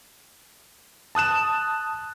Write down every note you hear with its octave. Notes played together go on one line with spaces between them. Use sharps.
A5 D#6 F#6 E7